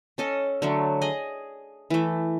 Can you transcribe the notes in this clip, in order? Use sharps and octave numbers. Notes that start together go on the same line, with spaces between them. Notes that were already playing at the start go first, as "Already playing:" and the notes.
C#4 A4 D#5
D3 F#3 A3
G#4 D#5 G#5
E3 A3